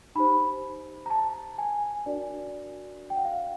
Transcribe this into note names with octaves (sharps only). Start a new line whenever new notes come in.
D#4 G4 C5 B5
A#5
A5
G#5
D4 F#4 A#4 D5
G5
F#5
F5